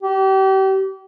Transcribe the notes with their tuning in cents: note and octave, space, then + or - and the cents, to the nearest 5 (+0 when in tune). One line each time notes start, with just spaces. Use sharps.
G4 -35